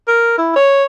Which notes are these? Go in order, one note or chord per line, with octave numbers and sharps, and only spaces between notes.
A#4
E4
C#5